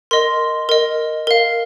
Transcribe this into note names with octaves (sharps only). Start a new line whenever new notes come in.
A#4 D#5 C6
A#4 D#5
A#4 F5